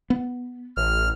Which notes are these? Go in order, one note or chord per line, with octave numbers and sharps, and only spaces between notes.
B3
A1 F6